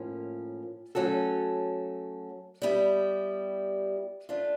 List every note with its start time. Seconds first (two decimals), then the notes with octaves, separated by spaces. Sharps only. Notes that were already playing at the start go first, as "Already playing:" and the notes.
Already playing: A2 F3 A#3 C#4
0.95 F#3 A3 C#4 F#4 A4
2.62 G3 B3 E4 G4
4.29 A3 D4 F4